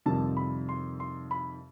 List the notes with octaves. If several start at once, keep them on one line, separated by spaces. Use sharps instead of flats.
F2 C3 D#3 G3 A5
B5
C6
C6
B5